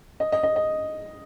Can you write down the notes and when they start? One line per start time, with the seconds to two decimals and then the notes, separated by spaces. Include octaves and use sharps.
0.20 D#5
0.32 D#5
0.43 D#5
0.56 D#5